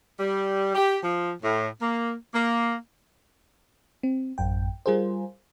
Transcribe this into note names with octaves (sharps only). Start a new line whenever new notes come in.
G3
G4
F3
A2
A#3
A#3
C4
A1 F#2 G5
G3 F4 G#4 A#4 C5